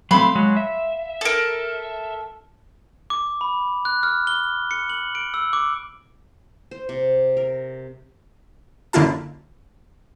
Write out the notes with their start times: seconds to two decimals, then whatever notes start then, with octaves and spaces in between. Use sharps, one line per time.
0.11 F#3 A3 C4 F5 B5 C6
0.35 F#3 G#3 F#4
0.57 E5
1.21 A4 A#4
3.10 D6
3.41 B5
3.85 F#6
4.03 F6
4.27 G7
4.71 C#7
4.89 F#7
5.15 D7
5.34 E6
5.53 D6
6.71 C5
6.89 C3
7.37 A#4
8.93 F#2 D3 A#3 E4 F4 A5